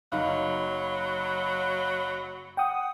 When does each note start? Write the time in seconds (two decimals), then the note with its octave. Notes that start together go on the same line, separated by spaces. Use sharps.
0.12 F#1 F#3 D#4 F5 B5
2.57 F#5 G5 D#6